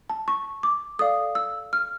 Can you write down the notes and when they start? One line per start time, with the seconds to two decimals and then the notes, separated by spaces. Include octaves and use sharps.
0.10 A5
0.28 C#6
0.63 D6
0.99 A4 D5 F5 D#6
1.35 E6
1.73 F6